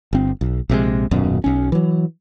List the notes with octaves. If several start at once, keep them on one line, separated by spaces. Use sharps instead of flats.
G1 C4
B1
A#1 C3 G#3
D#1 F#2 B2
B1 C#4
E3 F#3